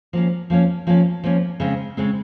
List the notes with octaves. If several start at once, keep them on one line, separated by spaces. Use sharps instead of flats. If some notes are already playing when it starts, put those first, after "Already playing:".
F3 A#3 C#4
F3 A#3 C#4
F3 A#3 C#4
F3 A#3 C#4
C#3 G#3 C4
C#3 G#3 C4